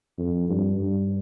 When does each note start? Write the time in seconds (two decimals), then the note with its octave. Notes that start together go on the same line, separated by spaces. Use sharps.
0.18 F2
0.49 G2
0.79 G2